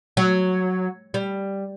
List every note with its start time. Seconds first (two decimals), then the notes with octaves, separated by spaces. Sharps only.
0.17 F#3
1.14 G3